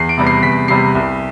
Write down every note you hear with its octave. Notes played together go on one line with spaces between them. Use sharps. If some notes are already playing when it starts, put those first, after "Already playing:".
Already playing: E2 C7
D7
C3 G3 B3
C7
E2 B6
C3 G3 B3 C7
C2